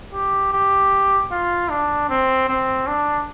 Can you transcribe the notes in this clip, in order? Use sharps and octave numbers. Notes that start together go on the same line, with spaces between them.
G4
G4
F4
D4
C4
C4
D4